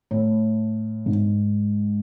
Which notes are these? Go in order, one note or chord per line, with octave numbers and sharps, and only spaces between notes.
A2
G#2